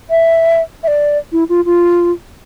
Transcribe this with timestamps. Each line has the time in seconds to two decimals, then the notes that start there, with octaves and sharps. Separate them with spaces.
0.10 E5
0.83 E5
0.87 D5
1.32 E4
1.49 F4
1.65 F4